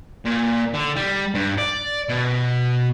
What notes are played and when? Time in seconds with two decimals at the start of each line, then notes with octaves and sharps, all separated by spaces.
0.25 A#2
0.74 D3
0.96 G3
1.35 G2
1.58 D5
2.09 B2